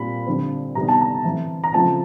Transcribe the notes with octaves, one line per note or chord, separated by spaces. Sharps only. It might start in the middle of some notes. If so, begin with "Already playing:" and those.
Already playing: A#2 G3 C4 B5
D3 G3 C4
C3 D#3 G3 B3 A#5
A5
A#5
E3 A3 C4
A#5
C#3 F3 A3 C4 A5